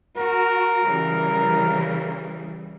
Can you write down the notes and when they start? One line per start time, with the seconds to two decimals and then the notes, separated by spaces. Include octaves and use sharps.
0.18 F#4 A#4
0.84 C#3 E3 G3